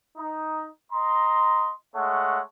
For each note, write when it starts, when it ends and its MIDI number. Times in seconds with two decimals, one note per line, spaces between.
0.18 0.67 63
0.92 1.71 75
0.92 1.71 82
0.92 1.71 84
1.96 2.40 56
1.96 2.40 57
1.96 2.40 73
1.96 2.40 78